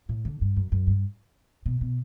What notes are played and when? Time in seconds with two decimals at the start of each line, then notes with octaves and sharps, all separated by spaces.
0.09 A2
0.25 D3
0.41 G2
0.56 F#2
0.72 F#2
0.87 G2
1.66 B2
1.81 B2